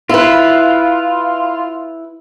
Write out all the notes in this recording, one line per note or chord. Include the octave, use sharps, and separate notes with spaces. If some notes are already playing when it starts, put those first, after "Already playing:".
E4 F4 B4